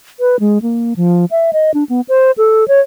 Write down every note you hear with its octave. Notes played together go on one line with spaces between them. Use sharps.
B4
G#3
A#3
F3
E5
D#5
D4
B3
C5
A4
C#5